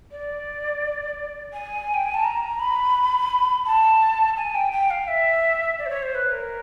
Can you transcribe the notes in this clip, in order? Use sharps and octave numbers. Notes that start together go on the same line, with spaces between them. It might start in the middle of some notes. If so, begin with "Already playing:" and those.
D5
G#5
G5
G#5
A5
A#5
B5
A5
G#5
G5
G5
F5
E5
D5
C5
C#5
C5
B4
A#4